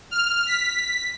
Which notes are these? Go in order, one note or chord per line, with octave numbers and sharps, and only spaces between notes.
F6
B6